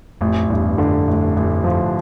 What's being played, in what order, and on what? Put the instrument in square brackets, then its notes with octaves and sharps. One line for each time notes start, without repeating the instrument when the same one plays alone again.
[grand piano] A1 [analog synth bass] F2
[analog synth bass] E2 [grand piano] G2
[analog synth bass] F2 [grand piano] D3
[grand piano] A1
A1
F3